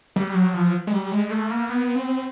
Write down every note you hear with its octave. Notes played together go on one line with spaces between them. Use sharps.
G3
F#3
F3
G#3
G3
G#3
A3
A#3
B3
C4